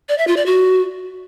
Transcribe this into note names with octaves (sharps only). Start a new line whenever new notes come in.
D5
E5
F4
D5
F#4